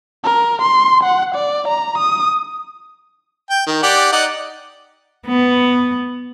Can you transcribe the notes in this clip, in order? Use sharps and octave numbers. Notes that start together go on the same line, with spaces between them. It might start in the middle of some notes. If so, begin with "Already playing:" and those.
A#4
C6
F#5
D5
A#5
D#6
G5
D#3
G4 D5 F#5
D#4 D5 F#5
B3